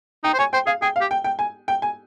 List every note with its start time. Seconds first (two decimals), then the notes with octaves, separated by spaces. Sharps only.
0.24 D#4 G5
0.34 C5
0.39 C#5 G#5
0.53 C5 G5
0.67 G#4 F5
0.82 G#4 G5
0.96 F5
1.01 G4
1.11 G5
1.24 G5
1.39 G#5
1.68 G5
1.82 G#5